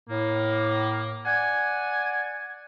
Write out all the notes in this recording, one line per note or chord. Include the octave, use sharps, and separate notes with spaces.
A2 A#3
D5 F#5 G#5